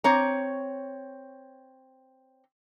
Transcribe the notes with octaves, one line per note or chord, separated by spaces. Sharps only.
C4 C#5 A#5